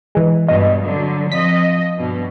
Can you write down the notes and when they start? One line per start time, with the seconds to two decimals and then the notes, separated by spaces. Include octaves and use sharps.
0.15 E3 G#3
0.48 G2 B2 G3 D#5
0.81 D3 F#3
1.32 F3 C4 D#5 B6
1.99 G2 B2